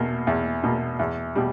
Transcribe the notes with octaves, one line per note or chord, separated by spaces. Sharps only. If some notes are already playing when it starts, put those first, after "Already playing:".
Already playing: E2 B2 A#3
E2
B2 A#3
E2
B2 G3